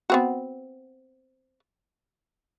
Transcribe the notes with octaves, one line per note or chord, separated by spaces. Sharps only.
B3 C4 F#4